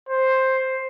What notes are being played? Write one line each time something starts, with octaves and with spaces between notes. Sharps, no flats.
C5